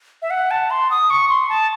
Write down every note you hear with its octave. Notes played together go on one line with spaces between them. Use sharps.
E5
F#5
A5
C6
D#6
C#6
C6
A5